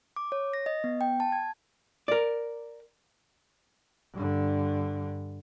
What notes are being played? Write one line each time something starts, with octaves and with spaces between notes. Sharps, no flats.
D6
C#5
A#6
D#5
B3
G5
A5
G#6
A#4 D5
G2 D3